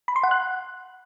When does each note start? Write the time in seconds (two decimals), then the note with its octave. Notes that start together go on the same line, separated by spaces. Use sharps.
0.08 B5
0.16 C6
0.23 F#5
0.31 F#6